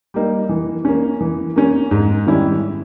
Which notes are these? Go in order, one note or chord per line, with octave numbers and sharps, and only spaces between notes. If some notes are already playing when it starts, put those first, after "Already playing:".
G3 A#3 D#4
E3
A#3 C#4
E3
A#3 C#4
G#2
D#3 G3 C#4 E4